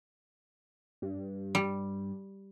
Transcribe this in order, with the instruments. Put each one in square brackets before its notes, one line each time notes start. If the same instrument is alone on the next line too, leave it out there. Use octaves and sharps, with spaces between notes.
[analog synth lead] G2
[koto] G3